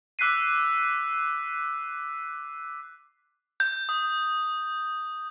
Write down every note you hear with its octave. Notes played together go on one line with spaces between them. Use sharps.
D6 E6 F#6 B6 C7 D#7
G6
D#6